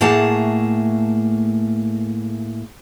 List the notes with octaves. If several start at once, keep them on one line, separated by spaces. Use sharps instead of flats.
A2 A3 A#3 G#4 F#5 A5